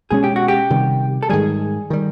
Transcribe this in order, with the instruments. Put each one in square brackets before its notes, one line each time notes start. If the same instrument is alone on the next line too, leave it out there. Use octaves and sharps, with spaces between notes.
[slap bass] B2 G#3 C#4 [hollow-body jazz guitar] G#4
[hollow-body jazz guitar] G4
F#4
G4
[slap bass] C3 D#3 G3
[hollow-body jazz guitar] A4
[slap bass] G#2 D#3 G3 [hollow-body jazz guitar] G#4
[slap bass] D#3 G3